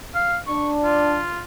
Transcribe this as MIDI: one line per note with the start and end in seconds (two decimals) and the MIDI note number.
0.15 0.37 77
0.47 1.20 62
0.47 0.70 85
0.84 1.42 65